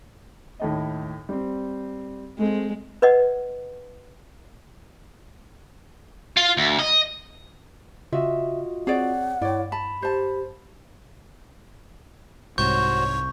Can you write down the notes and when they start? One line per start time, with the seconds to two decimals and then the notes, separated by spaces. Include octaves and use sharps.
0.60 D#2 A2 D#5
1.29 G3 C4
2.39 G#3 A3 C4
3.02 B4 D5 D#5 F#5
6.37 F4
6.57 D2
6.79 D#5
8.13 C#3 F4 F#4 D#5 E5
8.87 C4 G#4 C#5 D5 F#5
9.42 G2 E4 C#5 D5
9.72 A5 B5
10.02 G4 C5 A5
12.58 C2 G#2 F#4 C5 C#5 C#6 G6